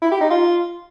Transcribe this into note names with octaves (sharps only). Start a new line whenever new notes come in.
E4
G4
D#4
F4